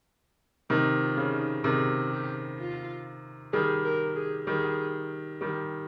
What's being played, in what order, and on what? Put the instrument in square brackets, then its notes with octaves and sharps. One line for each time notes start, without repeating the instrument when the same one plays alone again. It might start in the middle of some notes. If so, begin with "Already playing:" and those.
[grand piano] C3 D#3 [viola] D#4
[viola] F4
[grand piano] C#3
[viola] D#4
[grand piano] C3 D#3 [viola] G#4
[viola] G4
F4
[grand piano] D#3 G3 [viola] G#4
[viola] A#4
G#4
[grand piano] D#3 G3 [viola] G#4
[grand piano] D#3 G3 [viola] G4